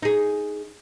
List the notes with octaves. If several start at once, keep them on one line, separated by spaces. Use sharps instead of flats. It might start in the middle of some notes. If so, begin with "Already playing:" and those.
D#4 G#4